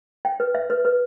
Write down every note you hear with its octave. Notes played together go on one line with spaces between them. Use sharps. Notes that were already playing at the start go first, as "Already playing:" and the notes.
G5
B4
E5
B4
B4